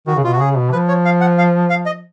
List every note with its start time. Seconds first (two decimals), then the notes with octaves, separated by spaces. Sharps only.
0.07 D#3 F#4
0.16 C#3
0.24 B2 F4
0.32 F#4
0.39 C#3 G#4
0.56 B2
0.72 F3 B4
0.88 C#5
1.05 F5
1.21 F#5
1.38 F5
1.70 F5
1.86 D#5